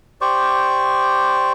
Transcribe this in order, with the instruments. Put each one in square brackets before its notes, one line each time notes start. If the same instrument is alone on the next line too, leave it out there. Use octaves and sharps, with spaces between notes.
[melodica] G4 C5 D5 C#6